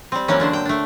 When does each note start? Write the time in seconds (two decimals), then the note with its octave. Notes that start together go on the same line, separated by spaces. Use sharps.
0.12 G3 C4
0.28 E3 F#3 A#3 C#4
0.40 D3 D4 C5
0.53 G5
0.65 A3 D4